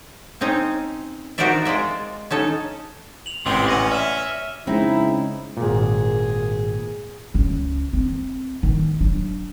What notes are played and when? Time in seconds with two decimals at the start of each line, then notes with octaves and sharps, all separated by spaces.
0.41 C4 C#4 D#4
1.38 D#4 F#4 A#4 C5 D5 E5
1.65 G#3 F4 D5 E5
2.31 C#4 D#4 A4
3.26 F7 F#7
3.46 A1 G#2 C3 B4 G5 C6
3.68 C#4 F#5 A#6 D#7
3.92 D5 E5 F6 D#7 E7
4.67 C#3 G#3 C4 D#4 E4
5.57 G#1 A#2 G#4
7.34 C#2 C#4
7.93 C4
8.63 D#3
9.01 F#3 D4